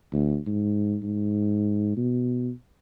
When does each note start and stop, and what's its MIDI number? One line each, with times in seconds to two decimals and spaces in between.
0.12 0.38 38
0.46 0.97 44
1.03 1.96 44
1.97 2.51 47